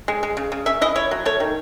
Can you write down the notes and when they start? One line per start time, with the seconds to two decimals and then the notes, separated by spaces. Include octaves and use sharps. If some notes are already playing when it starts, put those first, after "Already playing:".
0.08 G#3
0.23 G#3
0.37 C#3
0.52 C#3
0.66 C#4 E5
0.81 E4 D#5
0.96 E4 C#5
1.11 F#3
1.25 A3 C#5
1.40 D#3